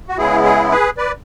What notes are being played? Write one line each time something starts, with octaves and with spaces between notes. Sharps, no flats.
F#4
C#3 G#3 B3 E4 G#4
G#4
G#4 B4
B4 D5